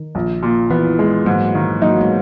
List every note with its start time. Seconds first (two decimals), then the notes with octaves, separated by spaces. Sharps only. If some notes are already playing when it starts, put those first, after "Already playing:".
Already playing: D#3
0.15 A#1
0.43 A#2
0.70 E3 B3
0.99 G#3
1.26 G#2 F#3 A#3
1.55 D#3
1.82 F#3 A#3 D#4
2.01 G#3 B3